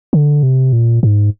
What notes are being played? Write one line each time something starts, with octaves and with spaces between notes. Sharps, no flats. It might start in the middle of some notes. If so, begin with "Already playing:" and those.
D3
C3
A#2
G#2